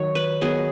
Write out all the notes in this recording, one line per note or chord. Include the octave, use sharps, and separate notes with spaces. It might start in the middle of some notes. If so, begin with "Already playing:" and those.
Already playing: D#3 F#3 C#5
B4
D#3 F#3 B3 G#4